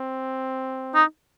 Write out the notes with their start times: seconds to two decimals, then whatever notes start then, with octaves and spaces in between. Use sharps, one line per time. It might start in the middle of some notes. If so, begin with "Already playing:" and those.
Already playing: C4
0.95 D#4